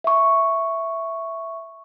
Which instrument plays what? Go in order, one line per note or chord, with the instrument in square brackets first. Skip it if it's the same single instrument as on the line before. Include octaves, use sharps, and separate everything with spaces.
[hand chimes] E5 C#6